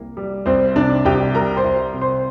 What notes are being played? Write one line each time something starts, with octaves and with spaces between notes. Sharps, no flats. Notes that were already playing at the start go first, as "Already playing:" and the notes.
Already playing: C2 A#3
G3
C2 C4 C5
C3 D4 D5
C2 G4 G5
G3 A#4 A#5
C5 C6
C2
C3
C5 C6